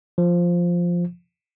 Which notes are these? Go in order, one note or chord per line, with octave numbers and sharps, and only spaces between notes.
F3